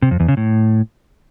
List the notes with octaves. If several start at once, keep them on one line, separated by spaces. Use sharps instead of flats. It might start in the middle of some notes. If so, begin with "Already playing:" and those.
C3
F2
E2
C#3
A2